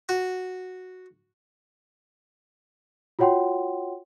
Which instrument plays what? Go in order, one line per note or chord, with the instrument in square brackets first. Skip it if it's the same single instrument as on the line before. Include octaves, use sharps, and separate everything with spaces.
[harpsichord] F#4
[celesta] F4 F#4 C#5 F#5 G5 C6